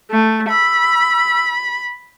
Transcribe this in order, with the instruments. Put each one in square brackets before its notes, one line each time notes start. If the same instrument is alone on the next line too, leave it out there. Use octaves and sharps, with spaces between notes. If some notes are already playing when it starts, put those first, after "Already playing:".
[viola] A3
[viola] B5 [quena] E6